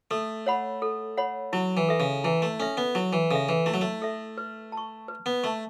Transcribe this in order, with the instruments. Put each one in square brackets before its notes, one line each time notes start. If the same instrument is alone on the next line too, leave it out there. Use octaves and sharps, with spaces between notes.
[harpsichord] A3 [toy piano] A4
[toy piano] C#5 F#5 B5
A4
C#5 F#5 B5
[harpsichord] F#3 [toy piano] E4
[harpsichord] E3
[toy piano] A4 E5
[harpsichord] C#3
[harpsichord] E3 [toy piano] E4
[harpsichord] A3
[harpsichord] C#4 [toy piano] A4 E5
[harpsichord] B3
[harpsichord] F#3 [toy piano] E4
[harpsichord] E3
[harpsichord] C#3 [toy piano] A4 E5
[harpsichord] E3
[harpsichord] A3 [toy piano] E4
[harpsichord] F#3
A3
[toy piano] A4 E5
B4
A5
C#6
B4
[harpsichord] B3
[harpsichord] A3 [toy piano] A5 C#6